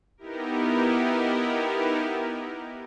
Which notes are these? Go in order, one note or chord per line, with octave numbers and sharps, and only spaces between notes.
B3 D#4 E4 G4 A#4